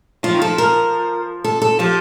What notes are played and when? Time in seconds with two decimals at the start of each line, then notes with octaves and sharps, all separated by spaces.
0.23 F3 F4
0.32 D#3
0.42 F3 A4
0.58 A#4
1.44 A4
1.62 A4
1.79 F3 G4